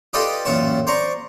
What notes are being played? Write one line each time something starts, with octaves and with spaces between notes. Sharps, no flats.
F4 G4 A4 B4 D5 D#5
A1 F#2 A#2 F4 C#5 A5
C5 D5 A#5 C#6